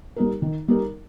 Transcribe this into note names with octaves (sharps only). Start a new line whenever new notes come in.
G3 D#4 A#4
D#3
G3 D#4 A#4